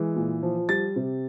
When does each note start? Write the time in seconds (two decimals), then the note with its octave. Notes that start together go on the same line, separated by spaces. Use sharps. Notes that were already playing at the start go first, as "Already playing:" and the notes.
Already playing: E3 G#3
0.16 A#2
0.43 F3
0.69 G3 A6
0.96 C3